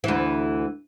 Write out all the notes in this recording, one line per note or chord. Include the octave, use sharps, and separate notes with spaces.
D2 E3